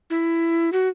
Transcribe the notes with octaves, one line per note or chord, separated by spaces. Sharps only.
E4
F#4